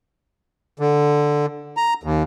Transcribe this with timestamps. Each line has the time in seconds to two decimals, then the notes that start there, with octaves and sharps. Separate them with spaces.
0.79 D3
1.77 A#5
2.03 D#2